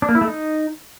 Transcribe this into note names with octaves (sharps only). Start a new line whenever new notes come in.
D4
A#3
E4
A3
D#4